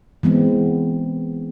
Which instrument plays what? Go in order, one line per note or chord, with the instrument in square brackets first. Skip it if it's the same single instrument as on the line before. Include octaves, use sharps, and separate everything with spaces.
[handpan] E3 G#3 B3 C4